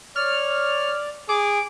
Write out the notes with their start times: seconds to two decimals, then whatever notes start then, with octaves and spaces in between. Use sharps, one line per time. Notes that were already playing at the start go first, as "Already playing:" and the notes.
0.16 C#5 D5 F6
1.29 G#4 D6